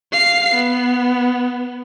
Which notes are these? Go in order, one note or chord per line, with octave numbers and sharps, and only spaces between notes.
F5 C7
B3